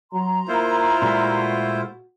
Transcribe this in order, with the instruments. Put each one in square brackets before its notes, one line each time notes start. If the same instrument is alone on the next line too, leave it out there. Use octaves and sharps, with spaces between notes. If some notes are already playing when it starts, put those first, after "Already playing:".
[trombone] F#3 [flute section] A#5 C6
[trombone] A#3 [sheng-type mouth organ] E4 F4 C5
[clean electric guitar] A#2 G#3 A3 [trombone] F#4